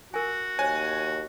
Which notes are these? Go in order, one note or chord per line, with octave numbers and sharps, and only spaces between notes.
F#4 A#4 G#5
D#2 C5 C#5 G#5